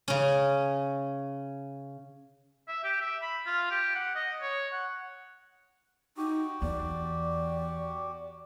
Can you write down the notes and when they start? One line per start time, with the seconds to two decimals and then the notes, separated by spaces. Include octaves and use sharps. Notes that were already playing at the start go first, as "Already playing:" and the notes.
0.08 C#3 C#4
2.68 E5
2.84 G4
3.01 E5
3.22 B5
3.47 F4
3.71 G4
3.95 F#5
4.15 D#5
4.42 C#5
4.73 F#5
6.17 D#4 F#4 G4
6.62 E2 D5